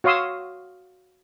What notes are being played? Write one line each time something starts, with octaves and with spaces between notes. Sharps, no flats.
F#4 C#5 F5 C6 D#6 E6